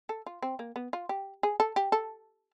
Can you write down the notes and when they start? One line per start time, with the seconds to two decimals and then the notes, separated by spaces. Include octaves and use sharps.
0.09 A4
0.26 F4
0.42 C4
0.59 A#3
0.76 B3
0.93 F4
1.09 G4
1.43 G#4
1.60 A4
1.76 G4
1.92 A4